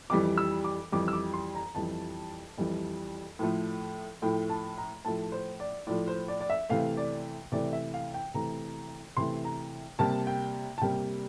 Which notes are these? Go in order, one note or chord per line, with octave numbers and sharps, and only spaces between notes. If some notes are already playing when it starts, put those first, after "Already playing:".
F2 E3 G3 D6
E6
D6
F2 E3 G3 D6
E6
D6
C6
A#5
F2 E3 G3 A5
F2 E3 G3
A2 F3 A3
A2 F3 A3 G5
A5
A#5
A2 F3 A3 A5
C5
D5
A2 F3 A3 D5
C5
D5
D5
E5
C3 E3 A3 F5
D5
C3 E3 A3 D5
E5
F5
G5
C3 E3 A3 A#5
C3 E3 A3 C6
A#5
C3 G3 A#3 A5
G5
A5
C3 G3 A#3 G5